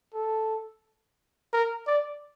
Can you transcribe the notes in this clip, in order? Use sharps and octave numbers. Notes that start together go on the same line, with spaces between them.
A4
A#4
D5